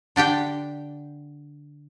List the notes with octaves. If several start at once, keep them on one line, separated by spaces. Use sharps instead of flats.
D3 D4 G4 G5